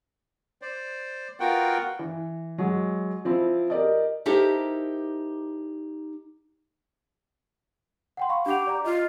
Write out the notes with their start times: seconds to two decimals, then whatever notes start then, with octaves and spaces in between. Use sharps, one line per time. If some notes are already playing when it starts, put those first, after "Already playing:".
0.62 C5 D5
1.40 B3 F4 F#4 A#4 F#5 G5
1.99 E3
2.58 F#3 G#3
3.25 F3 C4 E4
3.70 G4 A#4 D5 D#5
4.26 D#4 E4 G4 A4 A#4 C5
8.17 F#5 G5 C6
8.29 F5 B5 C#6
8.46 D4 G4 F#5 F7
8.67 D5 A#5
8.85 F4 D#5